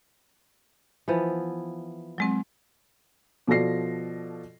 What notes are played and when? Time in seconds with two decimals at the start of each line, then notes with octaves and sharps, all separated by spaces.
1.08 E3 F3 B3
2.18 F#3 G#3 C4
3.48 B2 F3 A4 D5 A#6 C7